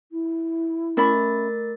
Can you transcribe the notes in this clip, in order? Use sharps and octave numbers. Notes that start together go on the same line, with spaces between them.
E4
A3 C#4 A#4 E5 B5 A6